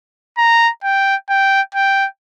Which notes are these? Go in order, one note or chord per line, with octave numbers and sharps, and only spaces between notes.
A#5
G5
G5
G5